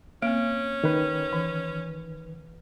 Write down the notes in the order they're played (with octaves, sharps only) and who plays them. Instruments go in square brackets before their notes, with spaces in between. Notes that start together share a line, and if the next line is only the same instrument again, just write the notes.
[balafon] A#3 C4 [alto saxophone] C#4
[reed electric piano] D#3 B4
[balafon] E3